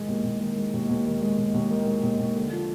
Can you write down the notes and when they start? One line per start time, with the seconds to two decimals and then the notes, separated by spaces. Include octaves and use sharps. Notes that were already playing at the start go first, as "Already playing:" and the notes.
Already playing: D#3 G#3
0.08 D#2
0.24 D#2
0.40 D#3
0.57 G#3
0.74 D#2
0.89 D#2
1.05 D#3
1.22 G#3
1.38 D#2
1.54 D#2
1.70 D#3
1.86 G#3
2.03 D#2
2.19 D#2
2.36 D3
2.52 F3